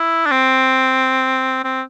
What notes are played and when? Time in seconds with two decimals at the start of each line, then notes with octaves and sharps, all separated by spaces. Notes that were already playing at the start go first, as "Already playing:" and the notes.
Already playing: E4
0.26 D4
0.31 C4
1.64 C4